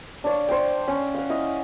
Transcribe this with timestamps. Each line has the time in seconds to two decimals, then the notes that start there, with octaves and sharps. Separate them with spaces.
0.24 D4 C#5 F5
0.48 C5 G5
0.88 C#4
1.14 F5 F#5
1.29 E4 D#5